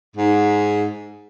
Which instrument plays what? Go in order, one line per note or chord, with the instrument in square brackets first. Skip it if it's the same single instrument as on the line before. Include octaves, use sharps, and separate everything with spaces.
[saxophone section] G#2